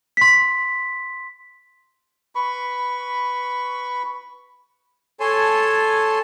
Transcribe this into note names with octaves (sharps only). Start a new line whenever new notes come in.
C6 B6
B4 B5 C#6
A4 C#5 G#5 A5 C6